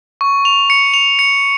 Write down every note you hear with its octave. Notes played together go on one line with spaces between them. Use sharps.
C#6
F7
C#7
F7
C#7